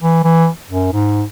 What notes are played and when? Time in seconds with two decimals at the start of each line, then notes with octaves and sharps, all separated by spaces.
0.02 E3
0.24 E3
0.70 F#2
0.92 G#2